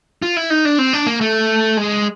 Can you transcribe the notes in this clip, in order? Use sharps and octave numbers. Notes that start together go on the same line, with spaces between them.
F4
E4
D#4
D4
C4
D4
A#3
A3
G#3